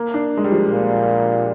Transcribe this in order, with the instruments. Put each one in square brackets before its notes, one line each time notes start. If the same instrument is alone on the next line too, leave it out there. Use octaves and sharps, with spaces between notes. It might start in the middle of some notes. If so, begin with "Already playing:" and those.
Already playing: [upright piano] A#3
D4
G#3
G3
F3
[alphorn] A#2